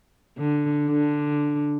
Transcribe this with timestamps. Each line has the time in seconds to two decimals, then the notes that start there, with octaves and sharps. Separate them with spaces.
0.37 D3
0.89 D3